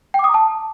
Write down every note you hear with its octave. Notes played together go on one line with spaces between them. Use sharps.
G5
D6
D#6
A#5
A5